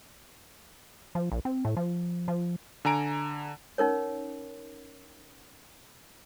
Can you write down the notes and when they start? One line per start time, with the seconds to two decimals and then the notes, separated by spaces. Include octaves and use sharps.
1.15 F3
1.32 A#1
1.45 C4
1.65 A2
1.77 F3
2.28 F3
2.85 D3 G#5 A#5 D7
3.78 C#4 D#4 A#4 C#5